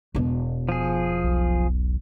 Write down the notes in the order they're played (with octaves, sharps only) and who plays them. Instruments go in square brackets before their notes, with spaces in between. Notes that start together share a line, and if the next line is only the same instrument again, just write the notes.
[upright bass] E1 B2
[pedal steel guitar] F3 G#4
[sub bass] B1